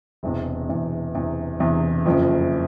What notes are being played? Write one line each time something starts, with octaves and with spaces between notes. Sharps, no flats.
E1 E2 C3
E1 E2 C3
E1 E2 C3
E1 E2 C3
F#1 F2 C#3 F3